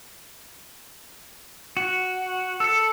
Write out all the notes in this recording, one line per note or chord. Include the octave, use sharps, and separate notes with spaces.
F#4
A4 E6 C#7